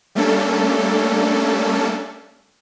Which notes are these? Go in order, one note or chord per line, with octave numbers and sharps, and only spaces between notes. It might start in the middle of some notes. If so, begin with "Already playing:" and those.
G3 A3 A#3 C#4 D4 A4